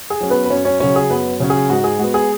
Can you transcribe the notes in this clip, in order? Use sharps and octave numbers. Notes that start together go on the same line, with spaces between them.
G#4
F#3 C#4
B3 B4
B4
F#2 C#4 C#5
C#4 C#5
C#3 F#3 C#4 C#5
G#4
F#2 B3 B4
C#3 F#3 C#4
G#4
G#2 F#4
G#4
G#3 B3 F#4
G#4